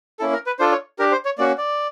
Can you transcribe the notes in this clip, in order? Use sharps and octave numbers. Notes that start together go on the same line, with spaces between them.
A#3 C#4 E4 A4
A#4
B4
D4 F4 A4 C5
C#5
D4 G4 A#4
C5
C#5
A#3 C#4 F#4 D5
D5